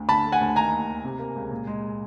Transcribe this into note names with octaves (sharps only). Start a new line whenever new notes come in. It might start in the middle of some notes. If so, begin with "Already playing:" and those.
Already playing: D2
D3 A5 B5
A3
F#5 G#5
D2
D#3 G#5 A#5
D#2
D#2
C3
A#3
C#2
A#2
G#3